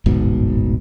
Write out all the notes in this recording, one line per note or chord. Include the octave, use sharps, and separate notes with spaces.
D1 G1 G#2 B2